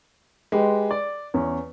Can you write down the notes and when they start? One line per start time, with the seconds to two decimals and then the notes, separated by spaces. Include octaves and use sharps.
0.52 G#3 G4 B4
0.91 D5
1.34 E2 C#4